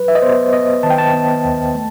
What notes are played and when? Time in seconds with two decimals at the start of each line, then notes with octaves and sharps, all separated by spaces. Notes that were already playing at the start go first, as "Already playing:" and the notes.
Already playing: F#3 B4
0.08 E5
0.15 D#5
0.22 B3 C5
0.52 B3 D#5
0.83 D#3 A5
0.90 G5
0.98 A5
1.14 B3
1.45 D#2
1.75 A3